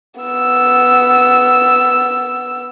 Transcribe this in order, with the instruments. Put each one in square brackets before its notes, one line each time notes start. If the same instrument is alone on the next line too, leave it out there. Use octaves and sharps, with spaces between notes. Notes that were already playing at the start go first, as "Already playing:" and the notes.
[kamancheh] B3 E6